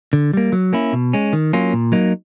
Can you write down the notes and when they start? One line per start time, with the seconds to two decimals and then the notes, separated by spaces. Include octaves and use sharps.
0.13 D3
0.33 G3 A#3
0.52 F#3
0.73 A#3 C#4 E4
0.93 B2
1.13 G#3 C#4
1.33 D#3
1.53 F#3 A#3 C#4 F4
1.73 A#2
1.92 F#3 A#3 D#4